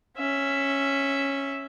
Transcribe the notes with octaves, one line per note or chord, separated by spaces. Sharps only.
C#4 E5